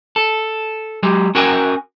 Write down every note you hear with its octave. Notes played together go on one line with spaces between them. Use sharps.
A4
F#3 G#3 G4
C#4 F#4 A#4 G5 G#5